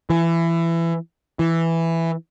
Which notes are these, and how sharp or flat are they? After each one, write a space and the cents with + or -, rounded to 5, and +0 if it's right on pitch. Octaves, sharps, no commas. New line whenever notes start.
E3 +20
E3 +5